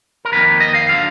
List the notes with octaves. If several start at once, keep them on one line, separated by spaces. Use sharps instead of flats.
A#4
F2 D#3 A#3 B4
D#5
F5
D3 F#3 F5